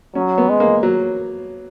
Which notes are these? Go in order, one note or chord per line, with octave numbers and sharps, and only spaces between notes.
F#3 C#4
B3
G#3
A#3
F#3